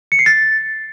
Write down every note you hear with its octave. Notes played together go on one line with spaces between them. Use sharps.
C#7
C7
A6